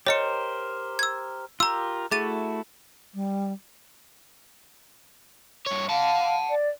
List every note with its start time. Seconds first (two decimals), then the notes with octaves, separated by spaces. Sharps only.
0.07 G4 A#4 C5 C#5 D#5 C#7
0.99 E6 G#6
1.60 F4 G4 A#4 A#5 E6
2.11 A3 E4 F#4 G#4 A6 D#7
3.14 G3
5.66 G2 C#5
5.90 F5 F#5 A5
6.50 D5